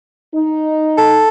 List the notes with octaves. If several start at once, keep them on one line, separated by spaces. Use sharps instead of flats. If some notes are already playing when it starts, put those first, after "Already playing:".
D#4
A4